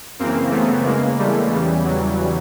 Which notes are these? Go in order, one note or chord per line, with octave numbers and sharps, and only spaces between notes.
F#2 C#3 E3 A#3 C4
A3 B3
E2 C#3 E3 G#3 A#3
G3 A3
E2 C#3 E3 G3
F#3